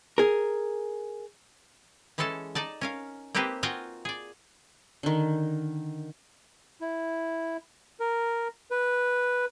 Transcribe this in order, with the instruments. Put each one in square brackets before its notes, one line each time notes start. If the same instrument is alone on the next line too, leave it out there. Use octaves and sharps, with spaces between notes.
[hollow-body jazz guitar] G#4 A#4
[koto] E3 G#3 C#4 A4 A5
D#4 D5 A5
C#4 A#4 F5
A#3 C4 D#4 G4 B4 C5
F4 F#4 D#5 F5 G5 G#5
G#4 D5
[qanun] D3 D#3
[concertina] E4
A#4
B4